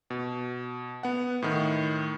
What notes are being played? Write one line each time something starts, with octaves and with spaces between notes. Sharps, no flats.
B2
B3 F#5
A2 D#3